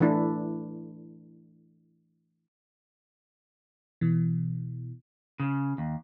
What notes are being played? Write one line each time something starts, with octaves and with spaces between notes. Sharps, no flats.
E3 A3 D4 E4
B2 E3
C#3
D#2